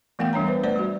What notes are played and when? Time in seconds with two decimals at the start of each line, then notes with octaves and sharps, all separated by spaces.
0.19 E3 A3 B3 A#4 F5 G5
0.33 G3 D4 C#5 A#5
0.47 B4 C5
0.63 A3 B4 C5 D5
0.76 G3 F#4